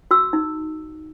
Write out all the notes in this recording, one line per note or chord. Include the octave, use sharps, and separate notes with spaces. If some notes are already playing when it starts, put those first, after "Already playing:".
F#4 E6
D#4